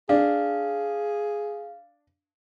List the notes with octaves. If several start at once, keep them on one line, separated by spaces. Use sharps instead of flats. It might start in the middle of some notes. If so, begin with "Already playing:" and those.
D4 G#4 F5